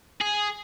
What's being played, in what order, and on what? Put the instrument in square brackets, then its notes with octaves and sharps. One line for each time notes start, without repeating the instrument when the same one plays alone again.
[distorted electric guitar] G#4